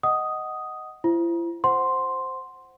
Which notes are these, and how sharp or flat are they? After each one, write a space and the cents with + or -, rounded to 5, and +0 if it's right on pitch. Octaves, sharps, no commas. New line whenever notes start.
D#5 +0 F#5 +10 D#6 +0
E4 +40 C5 +0
C5 +0 F#5 +0 C6 +0